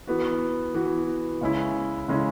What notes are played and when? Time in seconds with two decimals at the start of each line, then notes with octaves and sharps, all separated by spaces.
0.07 E3 B3 F#4
0.74 E3 B3 F#4
1.41 C#3 G#3 C#4 E4
2.08 C#3 G#3 C#4 E4